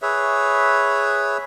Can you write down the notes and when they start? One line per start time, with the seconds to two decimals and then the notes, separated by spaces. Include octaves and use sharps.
0.02 G#4 B4 C#5 E5